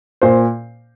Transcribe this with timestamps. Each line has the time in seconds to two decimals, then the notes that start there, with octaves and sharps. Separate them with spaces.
0.22 A#2 C5